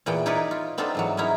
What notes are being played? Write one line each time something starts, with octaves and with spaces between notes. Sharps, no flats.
E2 A#2 E3 B3 G5
D#4 E4 A#4 B4 C#5 D5
F4
B3 C4 D4 D#4 F4 A4
G#2 E3 F#3
B3 C#4 D#4 E4 A#4